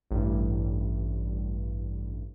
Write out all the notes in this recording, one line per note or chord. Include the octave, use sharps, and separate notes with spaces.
A1 G2